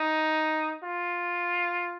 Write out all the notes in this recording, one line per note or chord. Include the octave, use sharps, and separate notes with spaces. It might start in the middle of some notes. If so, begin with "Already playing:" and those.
Already playing: D#4
F4